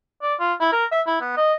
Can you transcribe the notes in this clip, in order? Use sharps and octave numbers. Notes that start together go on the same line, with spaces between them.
D5
F4
E4
A#4
E5
E4
B3
D#5